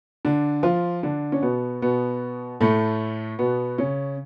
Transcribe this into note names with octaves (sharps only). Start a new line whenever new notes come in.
D3 D4
F3 F4
D3 D4
C#4
B2 B3
B2 B3
A2 A3
B2 B3
C#3 C#4